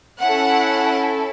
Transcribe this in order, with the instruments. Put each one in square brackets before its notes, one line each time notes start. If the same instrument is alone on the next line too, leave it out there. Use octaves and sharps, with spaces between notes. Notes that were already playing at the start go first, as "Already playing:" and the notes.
[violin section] C#4 E4 A4 F#5